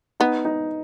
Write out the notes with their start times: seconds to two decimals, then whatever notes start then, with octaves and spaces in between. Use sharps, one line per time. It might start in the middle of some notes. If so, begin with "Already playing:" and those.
0.20 B3 D#4
0.45 D#4